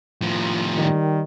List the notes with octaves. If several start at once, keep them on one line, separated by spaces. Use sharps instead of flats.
A2 F3
D#3 G3